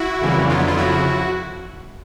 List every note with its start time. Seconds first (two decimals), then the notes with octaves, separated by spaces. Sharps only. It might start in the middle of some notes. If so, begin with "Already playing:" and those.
Already playing: E4 F#4
0.21 F2 C#3 E3 G3 A#3
0.49 F2 D3 F#3 B3 F4
0.59 E4
0.68 F4
0.77 F2 C#3 F3 E4 F#4